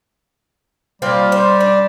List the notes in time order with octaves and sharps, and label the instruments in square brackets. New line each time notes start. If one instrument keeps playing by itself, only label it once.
[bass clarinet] G3 [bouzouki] A#3 C4 F4
[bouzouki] C5
D4